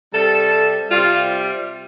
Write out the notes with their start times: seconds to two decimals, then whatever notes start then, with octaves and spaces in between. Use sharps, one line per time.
0.13 C3 G3 A4
0.90 C3 G3 F4